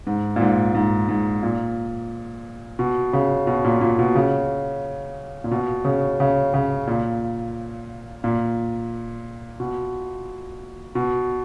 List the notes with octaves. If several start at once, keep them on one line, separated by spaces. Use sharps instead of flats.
G#2
A#2
G#2
G#2
G#2
A#2
B2
C#3
B2
A#2
A#2
B2
C#3
A#2
B2
C#3
C#3
C#3
A#2
A#2
B2
B2